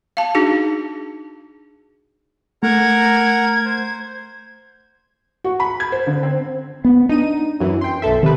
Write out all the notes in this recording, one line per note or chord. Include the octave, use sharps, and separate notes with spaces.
F5 A5
D4 D#4 F#4 G#4
A3 A#4 F#5 A#5 G#6
C5
F#4
B5
G#6
C5
D3
C4
B3
D4 D#4 D#7
F#2 E3
G5 C6
B1 A4 E5
C3 D#3 B4